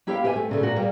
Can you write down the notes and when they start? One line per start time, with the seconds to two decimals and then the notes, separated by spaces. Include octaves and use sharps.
0.07 A#3 E4 G4 C#5 F5 G5
0.24 G4 C5 E5 F5 G#5
0.36 A3
0.49 A#2 C#3 A3
0.61 A#2 F#4 A#4
0.76 G3 A#3 G4 G#4